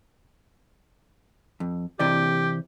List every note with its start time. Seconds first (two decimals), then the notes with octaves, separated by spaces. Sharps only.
1.60 F2
1.99 C3 E3 G4 D5